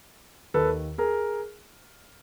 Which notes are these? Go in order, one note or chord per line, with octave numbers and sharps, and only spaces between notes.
D#2 D#3 A4 B4
G#4 A#4